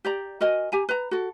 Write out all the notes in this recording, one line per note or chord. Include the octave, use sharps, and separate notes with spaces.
G4 D5 A#5
F#4 A#4 D#5 G#5
G4 G#5 A#5
B4 A#5
F#4 A4